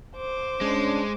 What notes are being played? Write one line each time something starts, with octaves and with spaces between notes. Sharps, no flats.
C5 D6
G#3 C#4 D4